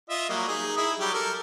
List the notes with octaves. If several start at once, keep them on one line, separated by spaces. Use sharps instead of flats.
F4 D#5 E5
F#3 G3 A#3
D#4 G#4
E4 G#4
F#3 G3 G4
A4 A#4